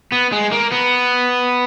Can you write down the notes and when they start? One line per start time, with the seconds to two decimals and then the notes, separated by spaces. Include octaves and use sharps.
0.12 B3
0.33 G#3
0.52 A#3
0.72 B3